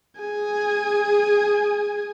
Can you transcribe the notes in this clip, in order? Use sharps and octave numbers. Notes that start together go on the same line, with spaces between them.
G#4 G#5